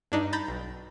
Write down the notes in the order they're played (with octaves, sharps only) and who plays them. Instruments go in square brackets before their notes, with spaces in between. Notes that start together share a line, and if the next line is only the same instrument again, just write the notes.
[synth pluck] G2 D4 D#4
A#5 B5 G6 A6
B1